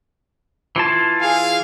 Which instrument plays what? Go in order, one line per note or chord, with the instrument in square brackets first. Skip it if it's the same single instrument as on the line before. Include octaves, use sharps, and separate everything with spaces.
[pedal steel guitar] E3 F4 A5 [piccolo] G#6
[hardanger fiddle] G#4 [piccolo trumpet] F5